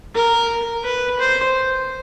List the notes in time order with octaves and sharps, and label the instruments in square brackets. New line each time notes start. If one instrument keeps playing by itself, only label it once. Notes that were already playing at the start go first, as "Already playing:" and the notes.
[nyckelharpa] A#4
B4
C5